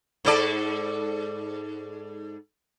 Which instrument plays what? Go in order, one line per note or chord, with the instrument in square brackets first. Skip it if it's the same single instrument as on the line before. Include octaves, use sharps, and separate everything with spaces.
[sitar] G#2 A4 D5